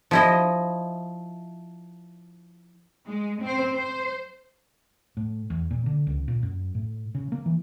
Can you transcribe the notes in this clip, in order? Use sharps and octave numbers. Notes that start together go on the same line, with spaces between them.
F3 E4 D#5
G#3
C4 C5
C5
A2
E2
A#2
D3
C#2
A#2
F#2
A2
C#3
A#3
E3